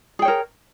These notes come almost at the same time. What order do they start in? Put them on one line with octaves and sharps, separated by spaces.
G#4 G5 C#5 A#4